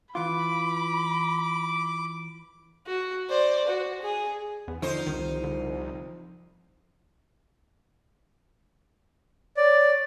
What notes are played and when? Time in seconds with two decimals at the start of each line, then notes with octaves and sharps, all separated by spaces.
0.15 E3 F4 B5 D6
2.86 F#4
3.29 C5 D5
3.68 F#4
4.01 G#4
4.68 E2 B3
4.82 D3 F3 D#4 C5
5.06 C2 D#3
5.44 D3
9.57 C#5 D5